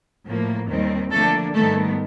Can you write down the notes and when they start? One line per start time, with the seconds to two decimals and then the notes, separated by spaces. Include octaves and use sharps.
0.26 A2 F3 A#3
0.69 D#2 D#3 G3 C4
1.12 D3 F3 A3 A#3 D4 A4
1.54 G#2 D#3 G3 A3 B3 A4